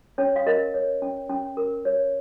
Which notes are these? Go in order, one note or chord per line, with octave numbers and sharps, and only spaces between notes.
C#4 C#5
F5
A#4 D#5
C#5
C#4
C#4
A#4
C#5